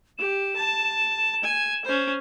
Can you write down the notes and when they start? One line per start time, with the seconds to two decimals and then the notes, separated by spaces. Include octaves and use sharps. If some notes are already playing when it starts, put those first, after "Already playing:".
0.18 G4 E7
0.56 A5
1.44 G#5
1.85 C#4 C5